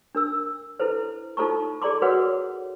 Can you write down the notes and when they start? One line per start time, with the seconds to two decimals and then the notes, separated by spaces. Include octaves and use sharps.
0.15 D4 A#4 E6
0.80 E4 A4 B4 C5
1.37 D#4 F4 A4 C5 A#5 C#6
1.82 G#4 A4 D5 A#5 C6 D6
2.02 F#4 G#4 A#4 B4 C#5 F#5